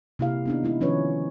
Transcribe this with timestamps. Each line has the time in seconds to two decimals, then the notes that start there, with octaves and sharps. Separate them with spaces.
0.19 C3 A#3 E4 G4 F5
0.46 B3 D4 D#4
0.63 E3 G#3 D#4 E4
0.81 D#3 F3 C#4 B4 C#5